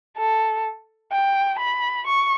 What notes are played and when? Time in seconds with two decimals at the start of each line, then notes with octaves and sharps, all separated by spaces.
0.17 A4
1.12 G5
1.59 B5
2.06 C#6